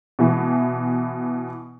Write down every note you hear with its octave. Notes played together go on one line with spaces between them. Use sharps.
B2 E3